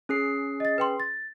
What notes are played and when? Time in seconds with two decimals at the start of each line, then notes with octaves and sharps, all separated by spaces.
0.09 C#4 G#4 C7
0.60 D#5 A6
0.78 B4 G5 C6
1.00 A6